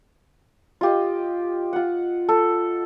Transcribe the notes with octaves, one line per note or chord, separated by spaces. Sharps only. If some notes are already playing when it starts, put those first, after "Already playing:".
F4 G4 D#5
F4 F#5
A4